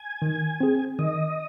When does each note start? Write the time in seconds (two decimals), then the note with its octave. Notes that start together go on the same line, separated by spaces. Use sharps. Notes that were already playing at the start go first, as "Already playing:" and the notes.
Already playing: G#5
0.22 D#3
0.61 C4 G#4
0.99 D#3 D#5